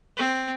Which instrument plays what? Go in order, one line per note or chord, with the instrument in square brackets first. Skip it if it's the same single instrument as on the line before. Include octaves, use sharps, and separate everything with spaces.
[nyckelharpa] C4